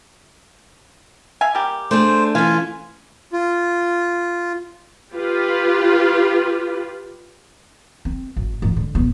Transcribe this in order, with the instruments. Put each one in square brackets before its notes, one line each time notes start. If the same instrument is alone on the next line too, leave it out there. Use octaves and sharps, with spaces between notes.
[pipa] E5 F5 G#5
G3 A#3 G4
[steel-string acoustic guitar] A3 D4 G#4 [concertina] C5
[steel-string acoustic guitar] E3 C#4 [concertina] F4 G#5 [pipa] F5
[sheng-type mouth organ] F4
[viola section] F4 G4 B4
[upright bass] C4
G#1
G#2 E3
D3
D#1 B3